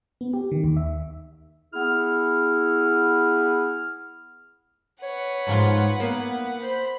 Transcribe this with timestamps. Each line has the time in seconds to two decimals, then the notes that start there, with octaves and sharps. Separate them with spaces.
0.21 B3
0.33 G4
0.52 D#3
0.64 D#2
0.77 E5
1.74 B3 E4 G#4 F6
5.03 B4 C#5 F#5
5.47 G#2 F3 F4
6.00 A#3 B3
6.62 C5 B5